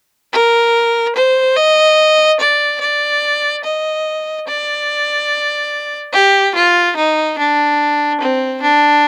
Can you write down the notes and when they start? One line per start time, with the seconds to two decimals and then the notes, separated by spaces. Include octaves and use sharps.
0.32 A#4
1.16 C5
1.57 D#5
2.40 D5
2.81 D5
3.64 D#5
4.47 D5
6.13 G4
6.55 F4
6.96 D#4
7.37 D4
8.20 C4
8.62 D4